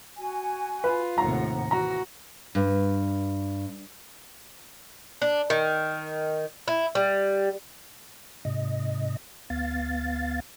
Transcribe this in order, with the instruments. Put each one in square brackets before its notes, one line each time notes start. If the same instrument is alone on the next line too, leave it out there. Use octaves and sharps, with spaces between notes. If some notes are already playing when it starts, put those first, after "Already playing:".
[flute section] F#4 G#5
[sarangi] F4 [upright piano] B4
[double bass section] D#2 A2 C3 [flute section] F#5 [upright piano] A#5
[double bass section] E3 [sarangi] F#4 [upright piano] A#5
[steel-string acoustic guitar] G2
[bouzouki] D4
D#3
E4
G3
[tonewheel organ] G#2 C3 D#5
D2 B3 F5 A6